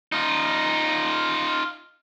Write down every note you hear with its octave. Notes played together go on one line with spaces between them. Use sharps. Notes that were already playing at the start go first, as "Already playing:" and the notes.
D#4 F4